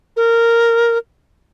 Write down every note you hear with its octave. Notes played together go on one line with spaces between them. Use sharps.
A#4